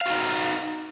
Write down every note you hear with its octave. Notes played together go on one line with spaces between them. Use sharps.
D#4 F#4 F5